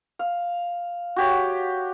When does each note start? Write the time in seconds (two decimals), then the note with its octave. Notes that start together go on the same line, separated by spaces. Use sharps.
0.19 F5
1.16 F#4 G4 C#5